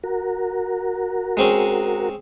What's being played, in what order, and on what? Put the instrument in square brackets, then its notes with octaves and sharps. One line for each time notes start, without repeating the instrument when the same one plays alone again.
[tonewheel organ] F#4 A#4
[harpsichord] G#3 C4 C#4